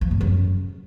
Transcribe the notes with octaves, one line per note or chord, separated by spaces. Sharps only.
F3
G#2
F#2